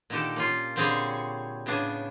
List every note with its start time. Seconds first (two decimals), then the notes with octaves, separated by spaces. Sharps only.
0.10 A#2 D3 D#3 G4 A4
0.36 A#3 C#4 F4
0.76 A#2 D3 G3 C4 G#4 C#5
1.66 A2 C#3 B3 D4 G#5